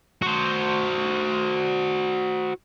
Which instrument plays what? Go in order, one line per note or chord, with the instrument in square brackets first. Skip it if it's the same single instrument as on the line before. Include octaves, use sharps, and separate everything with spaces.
[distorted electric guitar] F#4 C5